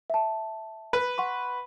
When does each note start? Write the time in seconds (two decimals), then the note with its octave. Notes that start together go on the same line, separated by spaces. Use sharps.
0.10 E5 A5
0.93 B4
1.18 F#5 C6 C#6